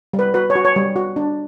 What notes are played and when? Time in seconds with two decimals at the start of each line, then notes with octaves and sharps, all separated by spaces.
0.13 G3
0.19 B4
0.34 F#4 B4
0.50 C#5
0.55 F#4
0.65 C#5
0.76 G3
0.96 F#4
1.16 D4